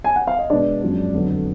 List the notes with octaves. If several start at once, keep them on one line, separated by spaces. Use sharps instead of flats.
G#5
F#5
F5
D#5
B2 G#3 B3 D4 D5
F#2 F3 G#3 B3
F2 D3 F#3 B3